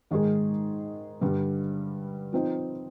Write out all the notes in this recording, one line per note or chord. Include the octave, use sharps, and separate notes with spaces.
G#2 D#3 G#3 D#4 G#4
G2 D3 G3
F3 C4 D#4